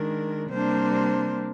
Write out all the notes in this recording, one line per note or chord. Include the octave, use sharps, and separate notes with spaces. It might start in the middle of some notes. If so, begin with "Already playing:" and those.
Already playing: D#3 G#3 D4 A#4
C3 G3 A#3 D4 C5